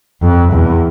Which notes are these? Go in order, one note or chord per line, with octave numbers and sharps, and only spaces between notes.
F2
E2